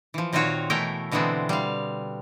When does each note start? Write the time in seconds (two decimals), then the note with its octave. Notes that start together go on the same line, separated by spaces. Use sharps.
0.14 E3 F3
0.33 A#2 D#3 C4 F4 F#4 C#5
0.70 B2 E3 A3 E4 A#4 G5
1.11 B2 D3 E3 G#3 B3 C4
1.49 G3 F5